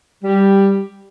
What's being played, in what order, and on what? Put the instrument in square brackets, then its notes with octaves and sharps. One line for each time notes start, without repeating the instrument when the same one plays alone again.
[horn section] G3